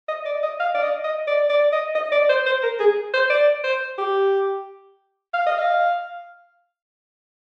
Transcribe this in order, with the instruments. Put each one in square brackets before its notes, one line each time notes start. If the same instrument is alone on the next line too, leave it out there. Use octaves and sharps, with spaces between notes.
[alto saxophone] D#5
D5
D#5
F5
D5
D#5
D#5
D5
D5
D#5
D#5
D5
C5
C5
A#4
G#4
C5
D5
C5
G4
F5
D#5
F5